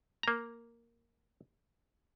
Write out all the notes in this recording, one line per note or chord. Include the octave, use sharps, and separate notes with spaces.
A#3 A#5